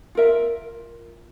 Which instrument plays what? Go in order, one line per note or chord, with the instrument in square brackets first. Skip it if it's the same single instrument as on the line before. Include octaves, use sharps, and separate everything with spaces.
[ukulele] F4 A#4 E5